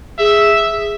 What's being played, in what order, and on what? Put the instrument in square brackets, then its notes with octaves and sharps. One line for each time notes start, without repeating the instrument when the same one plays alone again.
[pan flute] G#4 [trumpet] E5